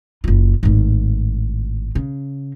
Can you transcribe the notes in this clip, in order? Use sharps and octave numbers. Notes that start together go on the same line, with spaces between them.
F#1 F4
G#1 A2
C#3